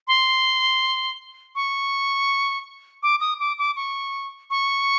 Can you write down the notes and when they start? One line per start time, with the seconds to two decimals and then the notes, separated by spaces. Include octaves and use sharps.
0.08 C6
1.55 C#6
3.03 D6
3.21 D#6
3.40 D6
3.59 D6
3.76 C#6
4.50 C#6